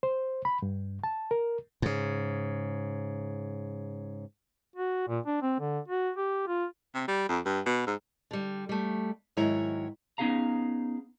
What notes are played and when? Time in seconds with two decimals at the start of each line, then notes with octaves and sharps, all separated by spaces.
0.03 C5
0.45 B5
0.62 G2
1.04 A5
1.31 A#4
1.82 G#2 C#3
4.76 F#4
5.08 A#2
5.26 D4
5.42 C4
5.60 D3
5.88 F#4
6.17 G4
6.47 F4
6.94 C3
7.08 G3
7.29 F2
7.46 G2
7.66 B2
7.87 G#2
8.31 D3 G3
8.69 G3 A3
9.37 G#2 D#3 F#3 E4 C#5 A#5
10.18 B3 C#4 D#4 G#4 F5 A#5